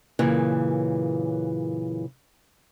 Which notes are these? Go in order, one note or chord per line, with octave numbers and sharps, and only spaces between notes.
F#2 A#2 C#3 E3